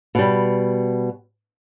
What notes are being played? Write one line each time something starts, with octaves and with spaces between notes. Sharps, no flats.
B2 G3